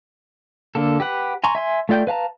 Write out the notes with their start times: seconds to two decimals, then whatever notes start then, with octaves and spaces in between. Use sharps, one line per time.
0.75 D3 A#3 A4
1.00 G4 B4 F#5
1.44 G#5 A#5 C6 C#6
1.55 E5 G#5 C6
1.89 A3 F4 D5 G5 G6
2.07 B4 F5 A5 A#5